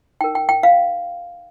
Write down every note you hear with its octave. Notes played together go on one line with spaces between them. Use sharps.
D#4 A#4 G5
G5
G5
F5